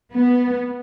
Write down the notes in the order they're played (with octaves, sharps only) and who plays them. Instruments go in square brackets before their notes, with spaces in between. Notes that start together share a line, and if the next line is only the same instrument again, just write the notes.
[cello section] B3